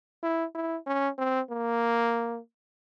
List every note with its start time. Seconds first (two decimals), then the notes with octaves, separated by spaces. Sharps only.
0.23 E4
0.55 E4
0.87 C#4
1.18 C4
1.50 A#3